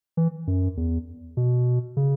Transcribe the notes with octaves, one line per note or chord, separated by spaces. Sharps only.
E3
F#2
E2
B2
C#3